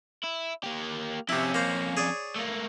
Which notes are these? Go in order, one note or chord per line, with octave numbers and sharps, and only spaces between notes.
E4
A#3 G4
F2 C3 C#4 E4
A#3 C5
G#4 C#5 D5
A3 A#3